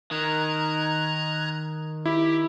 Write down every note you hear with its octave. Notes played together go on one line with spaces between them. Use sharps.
D#3 A#5 F#6 G#6
E4 G4